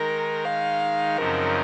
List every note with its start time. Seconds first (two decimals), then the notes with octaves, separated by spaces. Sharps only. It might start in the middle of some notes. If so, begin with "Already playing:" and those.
Already playing: D#3 G#3 D#4 A#4
0.44 F5
1.17 F#2 C#3 F3 C4 D#4 A#4